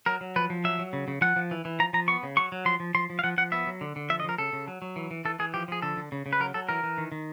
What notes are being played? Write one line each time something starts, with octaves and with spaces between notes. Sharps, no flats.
F#3 A#4
F#3
F3 B4
F3
F#3 E5
F#3
C#3
C#3
F3 F#5
F3
E3
E3
F3 A#5
F3 A#5
B3 C#6
C#3
F#3 C#6
F#3
F3 C6
F3
F3 C6
F3
F5
F3 F#5
F3 F#5
B3 E5
F#3
D3
D3
F3 E5
D#5
F3 A#4
C#3 A4
C#3
F#3
F#3
E3
E3
E3 A4
E3 G#4
F3 G4
F3 G#4
D3 A4
D3
C#3
C#3
B4
F#3 A#4
F#3 A4
E3 A#4
E3
D#3
D#3